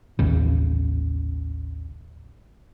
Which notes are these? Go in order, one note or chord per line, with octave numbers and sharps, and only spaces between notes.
A1 D#2 C#3